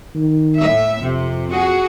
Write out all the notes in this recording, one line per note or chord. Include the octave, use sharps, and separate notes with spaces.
D#3
A2 E5
F2 C3
F#4 G#4